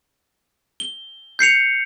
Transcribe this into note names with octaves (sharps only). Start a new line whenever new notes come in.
G7
G6 C7 C#7 F7